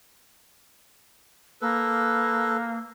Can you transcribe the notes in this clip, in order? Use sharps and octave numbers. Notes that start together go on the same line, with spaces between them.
A#3 A4 B4